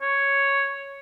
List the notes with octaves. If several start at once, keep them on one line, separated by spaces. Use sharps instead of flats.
C#5